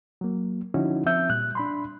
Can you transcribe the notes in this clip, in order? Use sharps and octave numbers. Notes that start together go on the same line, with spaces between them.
F#3 A#3
D3 F3 C#4 D#4 E4 F#4
F3 C4 E5 G6
A#2 G3 F#6
D4 B5 C6